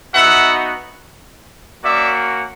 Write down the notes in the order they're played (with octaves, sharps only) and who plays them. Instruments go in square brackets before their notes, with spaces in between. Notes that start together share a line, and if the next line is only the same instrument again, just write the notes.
[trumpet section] B3 D#4 F#4 E5 F#5
A#3 C#4 F#4 D5 E5